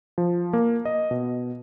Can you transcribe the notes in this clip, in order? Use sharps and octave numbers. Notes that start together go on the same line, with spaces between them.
F3
A#3
D#5
B2